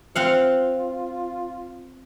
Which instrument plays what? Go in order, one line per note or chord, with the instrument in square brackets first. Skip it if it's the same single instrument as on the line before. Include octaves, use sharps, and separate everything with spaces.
[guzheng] C4 F5 F#5 [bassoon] F4